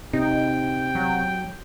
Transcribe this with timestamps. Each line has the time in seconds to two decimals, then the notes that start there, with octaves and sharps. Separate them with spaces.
0.13 C3 D#4 G5
0.95 F#3